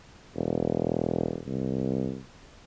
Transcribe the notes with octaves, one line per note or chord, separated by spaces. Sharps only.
E1
C2